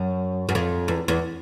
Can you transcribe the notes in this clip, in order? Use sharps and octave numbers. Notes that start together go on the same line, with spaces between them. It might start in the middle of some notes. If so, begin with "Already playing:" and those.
Already playing: F#2
F#2
F2
E2
E2